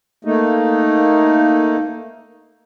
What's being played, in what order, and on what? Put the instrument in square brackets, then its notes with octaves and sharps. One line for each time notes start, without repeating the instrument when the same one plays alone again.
[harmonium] A3 A#3 D#4